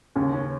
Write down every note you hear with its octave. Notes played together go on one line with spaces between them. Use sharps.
D#2 C#3 C#4
C#4